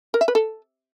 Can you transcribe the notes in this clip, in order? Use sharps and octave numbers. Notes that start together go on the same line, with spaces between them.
A#4
E5
B4
A4